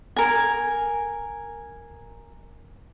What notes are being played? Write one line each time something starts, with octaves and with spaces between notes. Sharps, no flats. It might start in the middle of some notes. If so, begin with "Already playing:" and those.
A#4 G#5